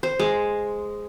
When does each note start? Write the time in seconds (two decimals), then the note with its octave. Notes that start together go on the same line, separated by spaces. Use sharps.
0.03 C5
0.19 G#3